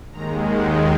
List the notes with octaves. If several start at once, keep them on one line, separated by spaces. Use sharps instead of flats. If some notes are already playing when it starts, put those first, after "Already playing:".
D#2 D#3 G#3 A#5
F#5